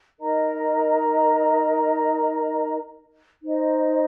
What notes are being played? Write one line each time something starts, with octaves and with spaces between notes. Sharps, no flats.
D#4 A#4 D#5 A#5
D#4 C5 D#5